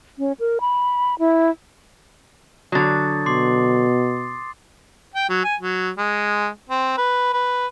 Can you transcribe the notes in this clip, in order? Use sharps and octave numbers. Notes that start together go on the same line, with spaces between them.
C#4
A#4
B5
E4
D3 F#3 D#6 A6
B2 C6 D6 C7
G5
F#3
G#5
F#3
G#3
C4
B4
B4